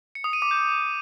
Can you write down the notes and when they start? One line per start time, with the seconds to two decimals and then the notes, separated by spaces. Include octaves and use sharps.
0.15 C#7
0.24 D#6
0.33 D#7
0.42 D6
0.51 G6